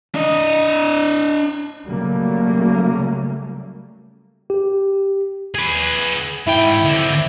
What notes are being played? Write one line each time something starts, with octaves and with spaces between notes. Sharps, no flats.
D4 D#5
C#3 F#3 G3 A3 A#3
G4
G#4 B4
G#2 E4 G5
D3 C4